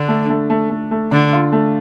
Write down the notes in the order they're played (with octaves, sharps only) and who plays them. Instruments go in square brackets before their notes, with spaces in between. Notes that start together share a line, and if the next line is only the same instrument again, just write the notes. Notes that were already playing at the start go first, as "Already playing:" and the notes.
Already playing: [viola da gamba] D3 [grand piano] D4
[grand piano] A3
A3
A3
A3
A3
[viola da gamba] D3 [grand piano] D4
[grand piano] F4
A3